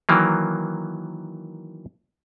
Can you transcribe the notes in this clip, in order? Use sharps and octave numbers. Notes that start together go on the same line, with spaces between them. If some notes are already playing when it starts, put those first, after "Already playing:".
D#3 E3 F#3 A#3